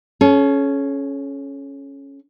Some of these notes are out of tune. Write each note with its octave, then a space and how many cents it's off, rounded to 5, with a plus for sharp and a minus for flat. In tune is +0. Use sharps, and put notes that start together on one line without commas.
C#4 +0 A4 -45